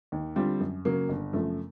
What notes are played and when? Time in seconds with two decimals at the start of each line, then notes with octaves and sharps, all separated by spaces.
0.12 D#2
0.36 D3 G3 C4 F4
0.60 F#2
0.85 C#3 F#3 A#3
1.09 G1
1.33 F#2 C#3 F3 A3